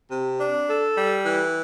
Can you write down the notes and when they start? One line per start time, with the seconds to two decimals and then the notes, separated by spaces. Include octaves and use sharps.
0.10 C3
0.39 D4
0.69 A4
0.97 G3
1.25 E3